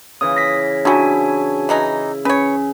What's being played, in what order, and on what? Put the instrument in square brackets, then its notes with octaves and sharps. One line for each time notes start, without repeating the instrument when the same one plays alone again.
[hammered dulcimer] C#3 E3 [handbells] D#6
[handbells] A#6 B6
[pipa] C3 F#3 [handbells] D4 F#4 G#5 [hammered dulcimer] E4
[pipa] E3 F#3 D#4
[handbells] C#4 [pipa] B4 C#5